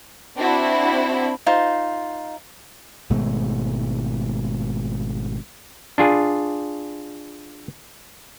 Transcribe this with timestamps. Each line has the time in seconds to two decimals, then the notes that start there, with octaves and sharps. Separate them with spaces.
0.36 C4 D4 E4 F#4
1.46 D#4 F4 C5
3.10 G#1 B2 G#3 A3
5.98 D4 F4 G#4